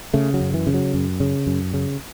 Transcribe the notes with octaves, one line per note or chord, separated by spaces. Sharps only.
C#3 A3
F#3
F#2
E3
C#3
F#3
F#2
C#3
F#2
C#3